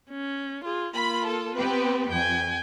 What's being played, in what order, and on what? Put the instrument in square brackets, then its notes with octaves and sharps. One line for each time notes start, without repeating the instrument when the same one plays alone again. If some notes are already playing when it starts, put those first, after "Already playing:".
[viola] C#4
F4 G#4
[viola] A#3 F4 [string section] B5
[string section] A4
[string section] B3 G4 B4 [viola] C4
[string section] F2 [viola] G5 G#5